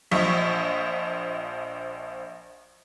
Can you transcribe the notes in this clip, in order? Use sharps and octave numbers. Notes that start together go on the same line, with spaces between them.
A#1 F3 D#5 E5 C#6 B6